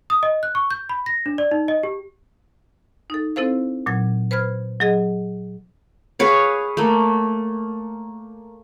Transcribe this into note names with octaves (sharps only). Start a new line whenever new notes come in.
D#6
D#5
F#6
C#6
G6
B5
A#6
D4
D5
D#4
D#5
G4
D#4 A4
C4 E4 A4 C5 F5
A#2 F#3 G#6
B4 C5 B5 F6 G#6
F#3 G#4 D#5
G#4 B4 C#5 F5
A3 A#3